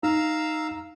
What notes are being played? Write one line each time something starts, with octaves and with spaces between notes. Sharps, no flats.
D#4 F5 A#5 E6